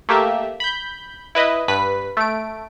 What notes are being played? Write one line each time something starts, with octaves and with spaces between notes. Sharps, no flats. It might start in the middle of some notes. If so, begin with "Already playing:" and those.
A3 A#3 G4 E5
B5 G6
E4 B4 D#5
G2 B4 B6
A3 D7